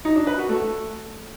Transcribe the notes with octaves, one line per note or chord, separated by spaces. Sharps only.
D#4
D4
B4
F#4
A3